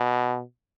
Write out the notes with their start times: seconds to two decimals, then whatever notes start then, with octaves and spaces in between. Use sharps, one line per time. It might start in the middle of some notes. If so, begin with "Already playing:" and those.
Already playing: B2